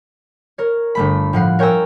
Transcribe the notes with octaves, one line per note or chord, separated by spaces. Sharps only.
A#4 C#5
G1 A3 B5
A2 F3 F#5 C7
A#4 C#5 G5 G#5 A#5 E6